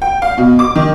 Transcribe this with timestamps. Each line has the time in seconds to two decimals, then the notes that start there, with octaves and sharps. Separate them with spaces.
0.02 G5
0.22 F5
0.37 B2
0.59 D6
0.75 D#3